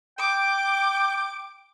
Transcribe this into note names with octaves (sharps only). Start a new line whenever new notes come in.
G5 D6